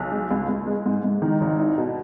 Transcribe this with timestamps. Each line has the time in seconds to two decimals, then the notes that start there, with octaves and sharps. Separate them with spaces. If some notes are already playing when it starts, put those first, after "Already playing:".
Already playing: B1
0.12 G#3
0.31 C#2
0.49 C#2
0.67 G#3
0.86 G#2
1.04 G#2
1.22 D#3
1.41 G#1
1.59 D#4
1.78 B2